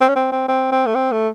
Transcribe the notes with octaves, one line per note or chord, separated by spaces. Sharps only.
C4
C#4
C4
C4
C4
C4
A3
C4
A3